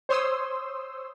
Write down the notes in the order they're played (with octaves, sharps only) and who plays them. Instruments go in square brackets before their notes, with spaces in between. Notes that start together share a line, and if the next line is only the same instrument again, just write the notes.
[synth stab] C5 C#5 C6 D#6 E6